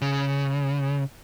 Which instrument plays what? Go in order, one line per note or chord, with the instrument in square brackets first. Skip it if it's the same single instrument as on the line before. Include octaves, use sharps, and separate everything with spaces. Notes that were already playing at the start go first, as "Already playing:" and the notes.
[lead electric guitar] C#3